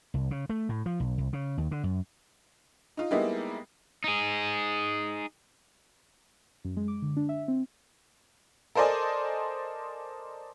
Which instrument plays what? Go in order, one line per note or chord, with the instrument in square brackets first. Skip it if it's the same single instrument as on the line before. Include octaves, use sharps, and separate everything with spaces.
[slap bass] C2
C#3
A3
A2
F3
B1
C2
C#3
D#2
D3
F#2
[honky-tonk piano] D#4 F4
G3 G#3 A#3 B3 D#4 E4
[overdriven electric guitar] D#4 G#4
[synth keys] F#2
G#3
D6
D3
D4
E5
C4
[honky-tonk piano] A4 A#4 C5 D5 D#5 G#5